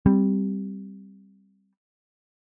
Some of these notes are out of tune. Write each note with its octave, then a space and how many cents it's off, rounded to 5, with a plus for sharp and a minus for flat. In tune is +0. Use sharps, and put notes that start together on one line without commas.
G3 +0 C4 +0